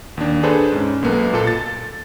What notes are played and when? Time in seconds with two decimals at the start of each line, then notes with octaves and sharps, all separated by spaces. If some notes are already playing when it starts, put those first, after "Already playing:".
0.17 D#2 D4
0.43 D4 G#4 A4 B4 C5
0.72 G#2 C#4
1.03 B1 A#3 B3 A4 B4
1.33 A#2 A4
1.47 A6